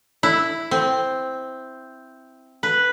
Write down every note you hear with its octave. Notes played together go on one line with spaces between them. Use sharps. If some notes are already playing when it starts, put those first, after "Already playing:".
E4
C4
B4